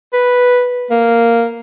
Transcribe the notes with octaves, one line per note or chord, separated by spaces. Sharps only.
B4
A#3